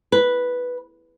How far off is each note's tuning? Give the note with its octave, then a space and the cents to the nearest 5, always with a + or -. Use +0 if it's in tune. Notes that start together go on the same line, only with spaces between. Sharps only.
B4 -5